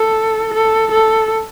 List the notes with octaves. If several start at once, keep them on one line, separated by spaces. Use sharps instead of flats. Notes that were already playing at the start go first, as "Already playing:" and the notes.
Already playing: A4
A4
A4